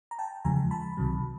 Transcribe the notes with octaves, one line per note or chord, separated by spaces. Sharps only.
A#5
G5 A5
E2 C#3 F3 G#3 G#5 A#5
A5 B5
C2 C3 D#3 F#3